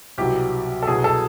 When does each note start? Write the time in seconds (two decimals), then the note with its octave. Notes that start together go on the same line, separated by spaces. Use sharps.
0.18 C2 B2 F#3 G4
0.83 A4
0.87 C2 B2 F#3 G#4
1.04 A4